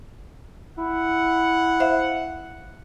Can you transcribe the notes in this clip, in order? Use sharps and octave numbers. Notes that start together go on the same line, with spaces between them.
E4 F#5
C5 E5 F5